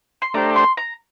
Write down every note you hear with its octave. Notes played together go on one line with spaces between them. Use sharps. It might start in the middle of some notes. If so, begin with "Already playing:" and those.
C6
A3 D4 G4 C5 A#5
C6
A#5